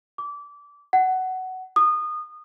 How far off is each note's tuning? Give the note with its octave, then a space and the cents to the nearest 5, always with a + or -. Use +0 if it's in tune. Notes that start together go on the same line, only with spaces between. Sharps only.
D6 -20
F#5 +15
D#6 -25